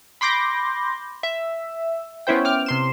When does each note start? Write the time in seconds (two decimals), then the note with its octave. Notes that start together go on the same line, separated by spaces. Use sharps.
0.21 B5 C6 D6 G6 A#6
1.23 E5
2.27 B3 C#4 E4 C5 G5
2.45 G5 D6 F6
2.66 C3 C6 E7